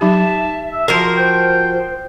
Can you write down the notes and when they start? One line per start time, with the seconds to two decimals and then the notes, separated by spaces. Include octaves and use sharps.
0.01 F#3 D#4 G4 E5 A5
0.73 E5
0.88 F3 F#4 A#4 C6
1.17 C5 G5